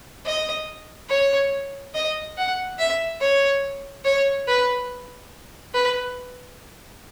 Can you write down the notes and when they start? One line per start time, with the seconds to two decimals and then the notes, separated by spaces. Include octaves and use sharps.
0.26 D#5
1.10 C#5
1.95 D#5
2.37 F#5
2.79 E5
3.21 C#5
4.05 C#5
4.48 B4
5.74 B4